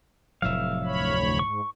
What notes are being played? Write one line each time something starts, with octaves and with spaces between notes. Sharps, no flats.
F1 A2 F#3 E5 F5
D2 C#5 B5
G#2 C#6